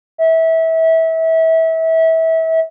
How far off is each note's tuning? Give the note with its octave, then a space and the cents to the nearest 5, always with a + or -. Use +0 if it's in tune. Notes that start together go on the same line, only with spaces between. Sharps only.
E5 -25